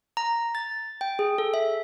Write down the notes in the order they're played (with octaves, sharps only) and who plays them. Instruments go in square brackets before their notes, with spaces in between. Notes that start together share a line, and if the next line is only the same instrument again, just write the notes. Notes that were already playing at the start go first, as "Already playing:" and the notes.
[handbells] A#5
A6
G5
G#4
A4
E5